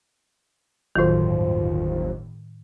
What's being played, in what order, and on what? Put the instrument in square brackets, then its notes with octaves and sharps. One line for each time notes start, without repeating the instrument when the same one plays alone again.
[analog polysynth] G1 D#2 [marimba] A2 D#3 [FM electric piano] F#3 F4 C5